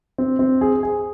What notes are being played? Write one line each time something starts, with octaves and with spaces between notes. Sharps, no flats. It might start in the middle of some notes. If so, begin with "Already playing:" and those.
C4
C4
G#4
G#4